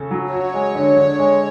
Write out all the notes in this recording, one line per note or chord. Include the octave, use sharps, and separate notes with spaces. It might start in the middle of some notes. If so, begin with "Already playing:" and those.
Already playing: C#3 C#4 A4
F#3
F#4 C#5
G#3
D3
D3
G#3